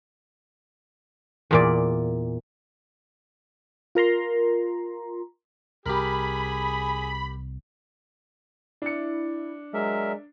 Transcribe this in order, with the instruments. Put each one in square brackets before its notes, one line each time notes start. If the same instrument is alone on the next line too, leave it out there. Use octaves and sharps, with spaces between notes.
[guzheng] E2 A#2 D5
[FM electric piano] F4 A#4 A#5 C6
[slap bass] C2 [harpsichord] G4 A#4 [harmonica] G#4 [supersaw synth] B5
[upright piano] D4 C#7 [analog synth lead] E4
[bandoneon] F#3 A#4 E5 [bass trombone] G#3 [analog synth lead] D5